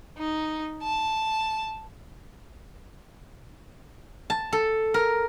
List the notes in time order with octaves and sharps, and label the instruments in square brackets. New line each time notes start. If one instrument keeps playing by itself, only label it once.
[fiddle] D#4
A5
[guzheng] A5
A4
A#4